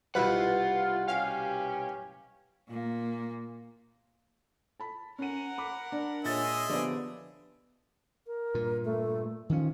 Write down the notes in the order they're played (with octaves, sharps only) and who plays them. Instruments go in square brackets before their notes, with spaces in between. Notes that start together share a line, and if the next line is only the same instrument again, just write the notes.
[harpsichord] C2 B2 [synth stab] E4 B4 [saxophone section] F4 [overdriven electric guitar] F#5
[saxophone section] C#4 G4 [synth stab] F5
[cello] A#2 A#3
[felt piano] A5 B5
[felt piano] C#4 D#7 [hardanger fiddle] A#4 F#5
[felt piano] B5 D6
[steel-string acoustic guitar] D4
[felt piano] A#2 A6 [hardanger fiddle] G#3 C#5 [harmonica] G#4 D#5 E5
[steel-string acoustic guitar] D3 F3 D5 [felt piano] B3 G4
[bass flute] A#4
[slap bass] G2 A#2
[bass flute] A3
[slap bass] D#3 C#4 [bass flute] F3